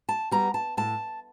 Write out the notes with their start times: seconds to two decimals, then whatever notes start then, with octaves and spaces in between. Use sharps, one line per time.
0.09 A5
0.31 G3 B3 A#5
0.54 A5
0.77 A2 A5